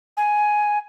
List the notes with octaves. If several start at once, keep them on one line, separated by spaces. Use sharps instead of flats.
G#5